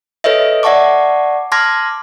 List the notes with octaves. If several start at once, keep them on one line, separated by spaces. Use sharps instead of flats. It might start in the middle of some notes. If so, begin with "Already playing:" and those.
A4 B4 C#5 D#5 E5
D5 E5 F#5 A5 C#6 D6
A5 C6 D6 F6 G#6 A#6